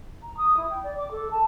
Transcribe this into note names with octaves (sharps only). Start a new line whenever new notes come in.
A#5
D#6
E4
G5
D5
D6
A4
A5